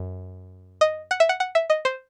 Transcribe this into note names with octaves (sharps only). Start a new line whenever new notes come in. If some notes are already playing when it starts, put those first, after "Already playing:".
Already playing: F#2
D#5
F#5
E5
F#5
F#5
E5
D#5
C5